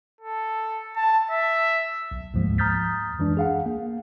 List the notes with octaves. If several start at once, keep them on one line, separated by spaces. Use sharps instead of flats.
A4
A5
E5
B1
D2 G#2 F3 G#3 A#3
A#5 D#6 F6 G6 A6 B6
F#2 E3 G#3 D4
G#4 F5 F#5
A#3